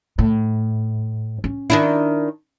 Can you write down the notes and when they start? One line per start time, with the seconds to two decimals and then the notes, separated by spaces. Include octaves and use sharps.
0.19 A2
1.44 C#4
1.70 D#3 D4 E4